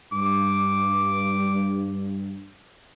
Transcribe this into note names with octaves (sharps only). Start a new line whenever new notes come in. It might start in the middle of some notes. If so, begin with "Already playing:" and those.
G2 D6